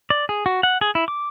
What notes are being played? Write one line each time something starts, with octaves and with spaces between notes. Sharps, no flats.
D5
G#4
F#4
F#5
G#4
E4
D6